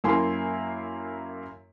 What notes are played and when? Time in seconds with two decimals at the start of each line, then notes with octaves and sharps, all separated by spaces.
0.04 F#2 A#3 E4 G#5 C6